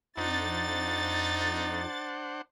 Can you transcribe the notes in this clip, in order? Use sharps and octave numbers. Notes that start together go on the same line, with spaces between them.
F2 D4 D#4 C5 F#5 A6